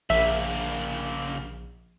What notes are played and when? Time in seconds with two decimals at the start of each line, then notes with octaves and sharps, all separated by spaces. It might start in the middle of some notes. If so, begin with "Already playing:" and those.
0.10 A#1 C#3 A#3 E5